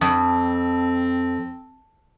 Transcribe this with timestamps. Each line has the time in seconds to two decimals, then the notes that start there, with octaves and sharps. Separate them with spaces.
0.01 F2 C4